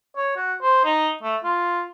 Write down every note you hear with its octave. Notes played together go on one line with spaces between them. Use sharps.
C#5
F#4
C5
D#4
A3
F4